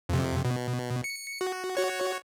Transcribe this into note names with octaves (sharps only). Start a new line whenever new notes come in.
F2 C3
B2
C#7
F#4
F#4 C#5